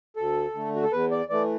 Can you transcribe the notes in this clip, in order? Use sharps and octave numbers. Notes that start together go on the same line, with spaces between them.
D2 A4
D3 A3
F#4
A4
E2 B4
D5
E3 A3 D5